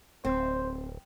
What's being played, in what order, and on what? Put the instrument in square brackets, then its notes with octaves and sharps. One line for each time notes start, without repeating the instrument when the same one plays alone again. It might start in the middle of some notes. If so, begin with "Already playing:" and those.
[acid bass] D1 [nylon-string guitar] C4 [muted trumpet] C5